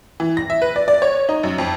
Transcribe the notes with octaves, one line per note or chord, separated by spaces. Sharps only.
E3
A#6
E5
B4
D5
D5
C#5
D#4
F#2
F2